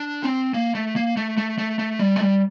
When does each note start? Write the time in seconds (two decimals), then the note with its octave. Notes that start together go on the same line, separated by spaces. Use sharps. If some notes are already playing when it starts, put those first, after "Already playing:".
Already playing: D4
0.24 C4
0.54 A#3
0.75 A3
0.96 A#3
1.17 A3
1.37 A3
1.58 A3
1.79 A3
1.99 G3
2.16 A3
2.20 G3